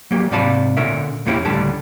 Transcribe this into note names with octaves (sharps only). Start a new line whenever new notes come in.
F#3 A#3 G4
G#2 C3 D5 F5 A5 B5
A#2 D3 C#4 A#4 E5
F2 A#3 B3 C#4 E4 G4
C#2 A2 D3 G3 A5